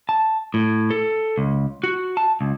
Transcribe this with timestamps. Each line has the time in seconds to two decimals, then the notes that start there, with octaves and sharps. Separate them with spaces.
0.09 A5
0.54 A2
0.90 A4
1.38 C#2
1.84 F#4
2.17 A5
2.41 C#2